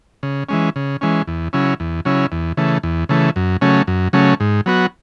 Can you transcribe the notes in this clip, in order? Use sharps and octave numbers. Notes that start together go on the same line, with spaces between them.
C#3
E3 G#3 C#4
C#3
E3 G#3 C#4
E2
C#3 F#3 C#4 E4
E2
C#3 F#3 C#4 E4
E2
C#3 E3 A3
E2
C#3 E3 A3
F#2
C#3 F#3 A3 C#4
F#2
C#3 F#3 A3 C#4
G#2
F#3 B3 F#4